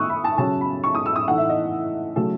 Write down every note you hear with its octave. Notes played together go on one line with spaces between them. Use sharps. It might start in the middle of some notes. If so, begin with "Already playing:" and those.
Already playing: D#3 A3 C#6 D#6 E6 F#6
B5
A5
C#3 F#3 C#4 A5
B5
C#6
D#6
E6
D#6
A2 E3 A3 D#4 F#5
E5
D#5
C#3 F#3 A3 A4